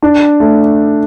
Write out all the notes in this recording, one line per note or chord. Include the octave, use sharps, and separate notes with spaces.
D4
A3